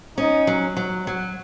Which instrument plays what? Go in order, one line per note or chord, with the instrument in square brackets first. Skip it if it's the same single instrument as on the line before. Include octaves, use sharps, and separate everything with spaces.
[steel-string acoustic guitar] C#4 [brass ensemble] D#4
[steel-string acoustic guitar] F#3
F#3
F#3